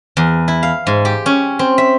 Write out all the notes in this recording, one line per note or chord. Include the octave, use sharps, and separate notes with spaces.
E2
E4
F5
G#2
G4
C#4
C4
E5